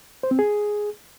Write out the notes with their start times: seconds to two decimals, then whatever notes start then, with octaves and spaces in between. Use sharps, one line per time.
0.23 C5
0.31 C4
0.39 G#4